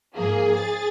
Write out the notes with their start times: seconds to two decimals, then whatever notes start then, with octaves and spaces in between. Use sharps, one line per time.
0.14 G#2 F3 A#3 G#4
0.56 A6